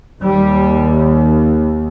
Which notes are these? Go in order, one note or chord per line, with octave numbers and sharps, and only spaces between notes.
D#2 G3